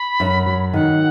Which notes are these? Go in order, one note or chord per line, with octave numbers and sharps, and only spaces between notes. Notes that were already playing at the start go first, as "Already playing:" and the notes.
Already playing: B5
F#2
F#3
D#3 F#5